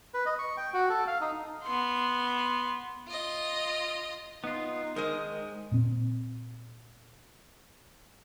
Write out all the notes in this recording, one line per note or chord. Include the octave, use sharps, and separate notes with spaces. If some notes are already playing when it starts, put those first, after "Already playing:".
B4
D#5
C#6
G5
F#4
A4
F5
D#4
B3 C6
F4 D#5
B3 D#4 F4
D#3 G#3 A#4 C5 D#5
A#2 C4